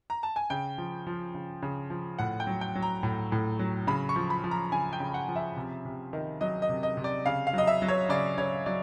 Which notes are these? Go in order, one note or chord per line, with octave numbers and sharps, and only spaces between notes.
A#5
A5
G#5
C#3 G5
F3
F3
C#3
C#3
F3
A2 F#5
G5
F#3
G5
F#3
A#5
A2
A2
F#3
C#3 B5
C#6
F3
B5
F3
A#5
C#3 G#5
G5
C#3
F#5
F3
E5
C3
C3
D#3
F#3 D#5
D#5
C3
D#5
C3
D5
C#3 F5
F5
F#3 D#5
E5
F#3
C#5
C#3 D5
C#3 C#5
F#3 D5